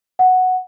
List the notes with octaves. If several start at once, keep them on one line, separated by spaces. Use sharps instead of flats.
F#5